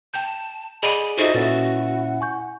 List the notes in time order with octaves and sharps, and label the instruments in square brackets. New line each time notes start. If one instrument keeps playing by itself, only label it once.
[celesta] G5 G6 [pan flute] A5
[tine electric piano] G#4 D5 F#5 [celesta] D#5 D7 D#7 [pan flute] B5
[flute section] D#4 A4 E5 [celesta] F4 C5 C7 [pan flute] F#4
[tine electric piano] A#2 C#4 E5 [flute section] E4 F#5 [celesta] B4 A6
[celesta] G#5 C#6 G6